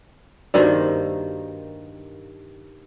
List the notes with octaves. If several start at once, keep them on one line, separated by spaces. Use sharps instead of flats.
G2 D#3 A#3 F#4 A#4 C5 D5